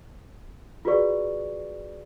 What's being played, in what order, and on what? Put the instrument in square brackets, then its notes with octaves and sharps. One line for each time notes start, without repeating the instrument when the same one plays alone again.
[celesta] F4 F#4 G#4 B4 D5 C#6